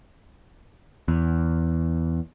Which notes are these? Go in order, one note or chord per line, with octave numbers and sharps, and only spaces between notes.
E2